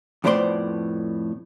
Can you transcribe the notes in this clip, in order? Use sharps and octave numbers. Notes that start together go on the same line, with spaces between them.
F2 A2 B3 C5 D5 C6